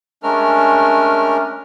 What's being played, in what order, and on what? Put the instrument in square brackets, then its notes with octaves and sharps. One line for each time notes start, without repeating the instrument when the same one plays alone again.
[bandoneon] G#3 A3 C#4 D4 A#4 F6